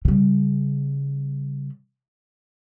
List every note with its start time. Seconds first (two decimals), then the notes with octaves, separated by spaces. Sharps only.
0.05 C#3 G3